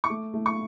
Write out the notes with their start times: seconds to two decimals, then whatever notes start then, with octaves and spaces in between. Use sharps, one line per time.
0.04 C#6
0.09 A3 D6
0.34 A3
0.46 C#6